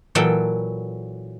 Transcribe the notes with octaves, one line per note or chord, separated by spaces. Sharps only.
A#2 E3 F#3 A4 G5